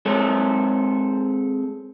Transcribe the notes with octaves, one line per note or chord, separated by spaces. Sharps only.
G#3 C4 A4 C#5